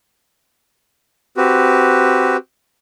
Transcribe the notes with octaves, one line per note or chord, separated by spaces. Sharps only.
C4 F#4 G4 B4